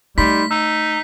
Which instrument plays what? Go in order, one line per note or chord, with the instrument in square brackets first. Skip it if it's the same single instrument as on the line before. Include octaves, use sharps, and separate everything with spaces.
[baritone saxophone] G3 [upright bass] A3 [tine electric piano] D#4 B5 C6 [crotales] B6
[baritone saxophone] D#4 [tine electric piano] E6